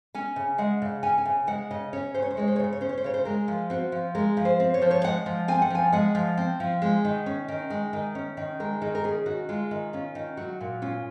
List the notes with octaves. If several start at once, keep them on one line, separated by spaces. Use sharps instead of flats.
C#4 G#5
C#3
G#3 F#5
C#3
C#4 G#5
G#5
C#3
G#3 F#5
C#3 D#5
C#4 C#5
C#3 C5
C#5
C5
G#3 C#5
C5
C#5
C#3 C5
C#5
C#4 C5
C#5
C5
C#3 C#5
C5
G#3 A#4
F3
C4 F#4
F3
G#3 A#4
F3
C5
C4
C#5
F3 C5
C#5
G#3 F#5
F3
C4 G#5
F#5
F3 G#5
G#3 F#5
F3
C4
F3
G#3
D#3
C#4
D#3
G#3
D#3
C#4
D#3
G#3 A#4
D#3 G#4
A#4
C#4 G#4
D#3 F#4
G#3 F4
D#3
C#4 F4
D#3
F#3 F#4
A#2
C#4 F4